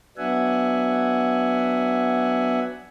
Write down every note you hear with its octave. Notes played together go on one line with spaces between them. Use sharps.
F#3 B3 D4 E5 F#5 G#5